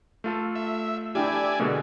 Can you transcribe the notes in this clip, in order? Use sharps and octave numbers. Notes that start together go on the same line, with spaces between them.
A3 F4 A4
E5
D4 E4 G4 D5 E5 G#5
B2 D3 G#3 A#3